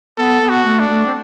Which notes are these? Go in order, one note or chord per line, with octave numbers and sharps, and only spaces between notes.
B3 A4
B3
F#4
A3
D4
A3
C4